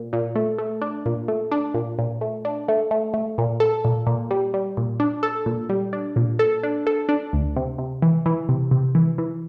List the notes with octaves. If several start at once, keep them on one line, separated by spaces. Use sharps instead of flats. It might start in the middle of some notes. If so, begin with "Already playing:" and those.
Already playing: A#2
A#2
A3
A3
D4
A#2
A3
D4
A#2
A#2
A3
D4
A3
A3
A3
A#2
A4
A#2
A#2
G3
G3
A#2
D4
A4
A#2
G3
D4
A#2
A4
D4
A4
D4
D2
C3
C3
E3
E3
C3
C3
E3
E3